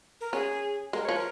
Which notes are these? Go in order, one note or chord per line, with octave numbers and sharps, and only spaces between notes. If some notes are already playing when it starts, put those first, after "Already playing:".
A#4
C#4 G#4
G#3 A#4
F3 C#5
A#4